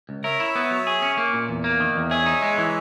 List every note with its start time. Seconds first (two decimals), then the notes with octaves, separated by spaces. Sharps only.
0.09 C#2
0.24 A#4 C#5 E5
0.40 E4
0.55 B3
0.71 F#3
0.87 G#4
1.02 C#4
1.18 A#3
1.33 A#2
1.49 E2
1.64 A#3
1.80 D#3
1.95 E2
2.11 G#4 C#5 E5
2.26 D#4
2.42 G#3
2.58 E3